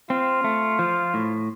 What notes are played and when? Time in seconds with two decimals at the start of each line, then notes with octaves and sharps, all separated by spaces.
0.10 C4 F4
0.44 A3
0.79 F3
1.14 A2